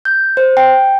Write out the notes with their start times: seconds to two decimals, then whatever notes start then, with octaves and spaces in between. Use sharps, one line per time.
0.05 G6
0.37 C5
0.57 G5